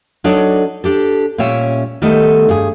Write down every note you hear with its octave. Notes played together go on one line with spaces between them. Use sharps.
F#3 D4 D#4 A4 C#5 D5
D4 G4 A4
A#2 G3 C#4 C#5 E5 G5
D#3 G3 A3 B3 D#4 A4
G2 G#4